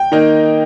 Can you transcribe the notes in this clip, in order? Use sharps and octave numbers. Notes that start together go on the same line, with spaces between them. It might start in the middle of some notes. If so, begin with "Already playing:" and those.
Already playing: G5
D#3 A#3 D#4